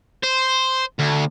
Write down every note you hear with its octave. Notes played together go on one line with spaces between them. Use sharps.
C5
D2